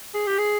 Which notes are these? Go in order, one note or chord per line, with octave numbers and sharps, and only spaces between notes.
G#4
G4
G#4